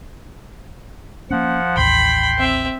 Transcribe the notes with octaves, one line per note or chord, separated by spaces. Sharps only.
F3 A#3 C#4 F#5
A1 D#2 G5 B5 C6
C4 E5